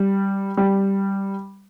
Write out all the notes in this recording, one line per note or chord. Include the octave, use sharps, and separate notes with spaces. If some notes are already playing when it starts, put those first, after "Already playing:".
Already playing: G3
G3